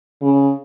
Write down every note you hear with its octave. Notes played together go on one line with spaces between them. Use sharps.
C#3